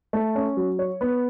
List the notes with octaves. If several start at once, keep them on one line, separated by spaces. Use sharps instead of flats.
A3
C#4
F#3
C#5
B3